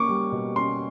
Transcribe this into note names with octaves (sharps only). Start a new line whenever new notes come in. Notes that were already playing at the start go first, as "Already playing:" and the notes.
Already playing: A#3 C#4 C#6 D6
G3
B2
C#4 C6